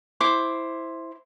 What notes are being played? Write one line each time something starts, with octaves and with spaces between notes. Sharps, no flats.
E4 C5 D6